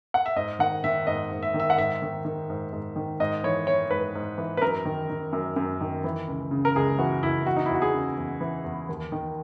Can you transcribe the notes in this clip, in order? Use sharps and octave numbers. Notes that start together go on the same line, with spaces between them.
F#5
E5
G#2 D#5
D#3 F#5
D#3 E5
G#2 D#5
G#2
E5
D#3
E5
F#5
G#2 E5
D#3
D#3
G#2
G#2
D#3
G#2 D#5
E3 C#5
E3 C#5
G#2 B4
G#2
E3
B4
F#2 A#4
D#3
D#3
F#2
F#2
D#3
E3
C#2
C#3
A#4
C#2 G#4
E3 F#4
C#2 E4
E3 F#4
D#4
E4
E2 F#4
G#4
C#3
E2
E3
E2
D#2
D#3